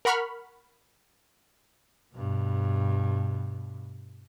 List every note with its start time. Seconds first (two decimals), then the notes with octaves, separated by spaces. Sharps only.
0.05 A#4 F#5 B5 C#6 F6
2.15 G2 B2